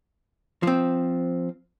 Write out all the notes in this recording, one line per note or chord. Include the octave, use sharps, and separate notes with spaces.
F3 C4